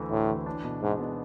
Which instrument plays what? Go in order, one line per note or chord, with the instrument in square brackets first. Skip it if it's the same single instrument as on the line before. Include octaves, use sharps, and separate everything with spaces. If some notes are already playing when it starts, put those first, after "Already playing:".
Already playing: [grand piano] D2 E3 A3
[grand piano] D2 [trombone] A2
[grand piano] E3
D4
B2
[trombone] G#2 [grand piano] G#3
[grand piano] B3